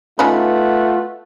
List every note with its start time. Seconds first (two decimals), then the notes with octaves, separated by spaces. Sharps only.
0.19 A3 B3 C#4 D#4 F4 B4